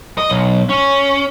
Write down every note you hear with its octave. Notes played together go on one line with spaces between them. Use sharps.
D#5
B1
C#4